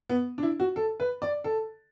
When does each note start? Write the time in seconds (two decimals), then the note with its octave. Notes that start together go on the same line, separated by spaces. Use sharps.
0.09 B3
0.38 D4
0.43 E4
0.60 F#4
0.76 A4
1.00 B4
1.22 D5
1.44 A4